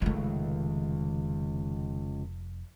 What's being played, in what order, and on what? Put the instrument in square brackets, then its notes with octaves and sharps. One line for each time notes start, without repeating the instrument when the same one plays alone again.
[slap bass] F1 [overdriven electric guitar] C#2 [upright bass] D#3 A3